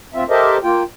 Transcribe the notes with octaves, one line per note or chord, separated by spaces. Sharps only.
D2 C4 F4 E5
G4 A4 A#4 C5 D#5 E5
A#3 F4 G5